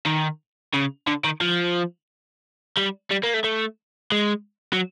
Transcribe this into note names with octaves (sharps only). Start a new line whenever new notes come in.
D#3
C#3
D3
D#3
F3
G3
G3
A#3
A3
A3
G#3
F#3